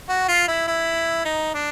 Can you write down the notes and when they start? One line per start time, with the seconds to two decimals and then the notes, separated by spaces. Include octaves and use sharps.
0.09 F#4
0.28 F4
0.48 E4
0.67 E4
1.25 D#4
1.54 D4